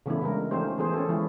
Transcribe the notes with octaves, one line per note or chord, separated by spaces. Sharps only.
C#3 E3 A3 B3 D4 E4
C#3 G3 G#3 A#4
F3 A3 C#4 D#4 G4 C5
E3 F3 B3 G#4 A4 C5
C#4 G4 A4
E3 F3 G#3 E4